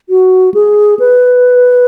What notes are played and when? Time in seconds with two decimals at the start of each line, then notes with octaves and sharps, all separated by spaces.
0.09 F#4
0.54 G#4
0.99 B4